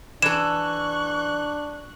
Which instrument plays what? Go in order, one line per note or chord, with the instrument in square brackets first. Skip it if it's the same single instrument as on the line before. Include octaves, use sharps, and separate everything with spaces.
[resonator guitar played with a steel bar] E3 A4 [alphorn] D4 [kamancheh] C#6 F#6 [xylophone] E7